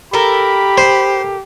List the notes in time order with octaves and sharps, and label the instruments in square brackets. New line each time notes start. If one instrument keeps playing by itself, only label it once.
[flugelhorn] G4 [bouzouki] A4 A#4 [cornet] B5
[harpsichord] C5